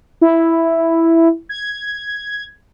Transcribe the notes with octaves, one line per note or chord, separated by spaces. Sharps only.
E4
G#6